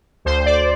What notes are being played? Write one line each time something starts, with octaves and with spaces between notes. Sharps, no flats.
D2 C5
D5